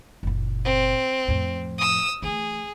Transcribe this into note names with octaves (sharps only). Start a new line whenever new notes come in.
F#1 A#2
C4
F2 A2
D#6 E6
E3 A3 G#4